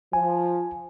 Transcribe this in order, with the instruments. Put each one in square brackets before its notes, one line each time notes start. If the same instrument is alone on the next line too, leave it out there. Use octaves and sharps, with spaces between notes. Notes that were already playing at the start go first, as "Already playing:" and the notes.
[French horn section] F3 [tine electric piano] G#5